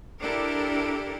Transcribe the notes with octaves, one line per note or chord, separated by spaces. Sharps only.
D4 E4 G4 A4 A#4